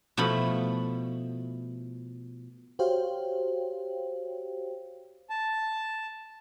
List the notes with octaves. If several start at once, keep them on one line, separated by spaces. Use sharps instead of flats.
B2 F3 A3 E4 B5
F#4 G4 C5 C#5 F5 G5
A5